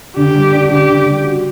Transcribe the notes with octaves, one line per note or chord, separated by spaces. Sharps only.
D3 G4
G3
D4
D3 G4
D3
G3
F#4